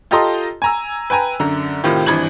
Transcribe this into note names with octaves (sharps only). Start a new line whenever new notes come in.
F4 G4 A4 D#5 A#5 C6
G#5 A#5 E6
B4 G5 G#5 A#5
F#2 D3 A#5
A2 C3 D#3 F4 G4
G#1 G2 E3 G#6 F#7